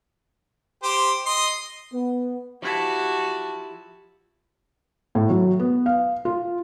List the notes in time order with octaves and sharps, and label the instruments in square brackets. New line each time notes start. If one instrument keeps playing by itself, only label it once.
[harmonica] G4 C5
D#5 C6
[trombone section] B3
[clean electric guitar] F3 E4 [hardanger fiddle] F#4 [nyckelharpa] G4 A5
[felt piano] A2
F#3
B3
F5
F4